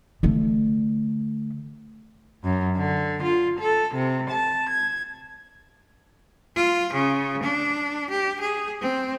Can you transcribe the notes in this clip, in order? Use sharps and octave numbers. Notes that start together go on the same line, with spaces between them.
D3 A3
F#2
D3
F4
A4
C3
A5
G#6
F4
C#3
D4
G4
G#4
C4